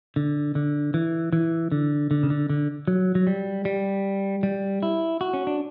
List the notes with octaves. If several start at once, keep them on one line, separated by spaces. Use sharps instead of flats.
D3
D3
E3
E3
D3
D3
C#3
D3
D3
F#3
F#3
G3
G3
G3
E4
F#4
C#4
D4